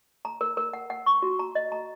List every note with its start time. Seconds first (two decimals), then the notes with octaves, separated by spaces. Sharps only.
0.25 A#5
0.41 A#4
0.57 A#4
0.73 F#5
0.90 F#5
1.06 C#6
1.22 F#4
1.39 A#5
1.55 D#5
1.72 A#5